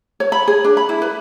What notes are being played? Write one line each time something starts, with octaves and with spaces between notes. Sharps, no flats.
C#5
B5
G#4
D4
B5
E4
B4